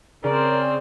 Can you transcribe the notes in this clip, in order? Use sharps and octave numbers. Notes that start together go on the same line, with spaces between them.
C#3 C4 A#4 D5